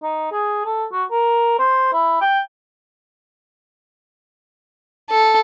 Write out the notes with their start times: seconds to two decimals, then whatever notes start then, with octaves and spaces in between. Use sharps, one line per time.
0.03 D#4
0.32 G#4
0.65 A4
0.92 F#4
1.11 A#4
1.59 C5
1.93 E4
2.21 G5
5.10 A4